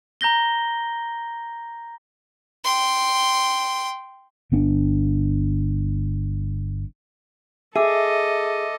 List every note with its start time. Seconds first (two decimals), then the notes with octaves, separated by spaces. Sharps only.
0.21 A#5 G6 A#6 G7
2.64 G5 C6
4.52 G1 B3 D4
7.76 G#4 A4 D#5 E5 D6 E6 D#7